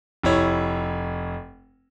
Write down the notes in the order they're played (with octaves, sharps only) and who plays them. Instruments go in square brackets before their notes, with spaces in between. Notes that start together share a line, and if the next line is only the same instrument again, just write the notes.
[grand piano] F1 E4 C#5